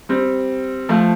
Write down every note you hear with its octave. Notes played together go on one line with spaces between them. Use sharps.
G3 C4
F3 A3